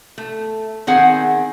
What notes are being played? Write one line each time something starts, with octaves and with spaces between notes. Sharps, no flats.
A3
D#3 C4 G#4 F#5